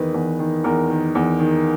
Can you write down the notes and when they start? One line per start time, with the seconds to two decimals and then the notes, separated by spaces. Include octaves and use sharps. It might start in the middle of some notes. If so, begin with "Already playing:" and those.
Already playing: E2 D#3 B4
0.14 E2
0.39 D#3
0.64 E2 A#4
0.90 D#3
1.15 E2
1.40 D#3